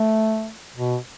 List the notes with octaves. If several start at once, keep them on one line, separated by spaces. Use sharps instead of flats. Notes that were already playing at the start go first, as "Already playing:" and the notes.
Already playing: A3
B2